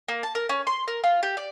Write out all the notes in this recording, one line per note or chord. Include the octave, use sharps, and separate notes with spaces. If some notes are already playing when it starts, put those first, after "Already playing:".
A#3
A5
A#4
C#4
C6
A#4
F4
G4
D5